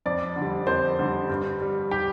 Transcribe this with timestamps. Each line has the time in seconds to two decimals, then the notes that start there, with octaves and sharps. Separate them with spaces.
0.06 F2 D5
0.36 D3
0.41 G3
0.67 F2 C5
0.99 D3 G3
1.30 G2
1.61 G3
1.91 G4